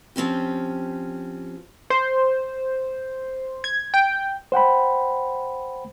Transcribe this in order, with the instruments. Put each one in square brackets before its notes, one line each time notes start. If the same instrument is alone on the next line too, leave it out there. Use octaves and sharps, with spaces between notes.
[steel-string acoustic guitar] F3 C4 C#4 G4
[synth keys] C5
G#6
G5
[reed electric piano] C5 F#5 G5 B5